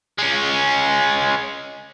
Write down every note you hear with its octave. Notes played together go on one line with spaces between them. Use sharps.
G#3 C#4